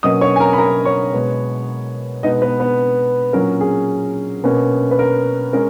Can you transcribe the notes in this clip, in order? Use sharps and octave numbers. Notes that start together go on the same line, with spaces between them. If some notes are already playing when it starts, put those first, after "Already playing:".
B2 F#3 A#3 C#4 D#5 D#6
C#5 C#6
G#5
A#4 A#5
B5
A#4 A#5
C#5 C#6
B2 G#3 B3
B2 G#3 B3 D#4 D#5
B3 B4
B3 B4
A#2 F#3 C#4 A#4
G#4
B2 A#3 C#4
B4
A#4
G#3 C#4 A#4